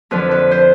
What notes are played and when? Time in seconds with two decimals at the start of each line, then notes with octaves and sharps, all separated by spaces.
0.11 F2 D3 F3 B4
0.31 B4
0.51 C5